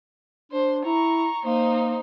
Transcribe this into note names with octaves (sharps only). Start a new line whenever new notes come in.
D4 C5
E4 A#5 C#6
A#3 D#4 C5